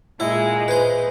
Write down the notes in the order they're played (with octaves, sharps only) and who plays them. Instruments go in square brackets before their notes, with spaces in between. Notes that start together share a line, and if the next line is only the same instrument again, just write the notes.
[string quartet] A#2 G#3 [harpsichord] E4
[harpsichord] B4 C5